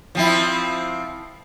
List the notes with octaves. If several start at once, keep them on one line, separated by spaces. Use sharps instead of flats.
F3 C4 E4